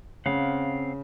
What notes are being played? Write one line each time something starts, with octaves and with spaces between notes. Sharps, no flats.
C#3 C4 F5 F#5